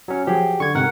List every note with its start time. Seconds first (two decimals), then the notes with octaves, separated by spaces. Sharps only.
0.08 F#3 C#4
0.27 F3 F#3 G4 G#4
0.60 D3 C#6 G#6
0.75 G#2 C3 A#4 F#5